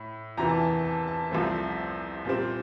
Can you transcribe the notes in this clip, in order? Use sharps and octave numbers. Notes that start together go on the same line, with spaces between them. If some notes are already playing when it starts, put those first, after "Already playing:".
Already playing: A2
E2 C3 E3 A#5
A5
A5
A5
A5
C2 C3 F3 A3 C4
A#2 G3 C4